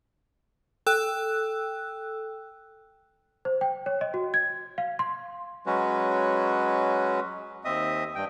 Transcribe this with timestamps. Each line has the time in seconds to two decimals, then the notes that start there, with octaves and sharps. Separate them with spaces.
0.87 A4 G5 E6 F#6
3.45 C5
3.61 G5
3.86 C#5
4.01 D#5
4.14 F#4
4.34 G#6
4.78 F5
4.99 C6
5.66 F#3 G#3 C#4 F#4 B4
7.65 D#2 C4 D#5 E5 D#6
8.15 G2 G5